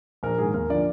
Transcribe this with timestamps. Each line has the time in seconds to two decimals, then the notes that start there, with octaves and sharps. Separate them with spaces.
0.23 A#1 A#4
0.38 G#2 D#3 G#4
0.54 D#2 A#4
0.70 D3 F3 D5